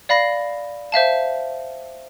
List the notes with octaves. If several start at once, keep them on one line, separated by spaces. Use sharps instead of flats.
D5 F5 B5 A#6 C7
C5 E5 F5 A5